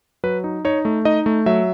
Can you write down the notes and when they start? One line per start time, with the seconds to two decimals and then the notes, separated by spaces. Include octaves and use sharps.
0.24 F#3 B4
0.44 D#4
0.65 D#4 C#5
0.85 A3
1.05 D#4 D#5
1.26 A3
1.46 F#3 E5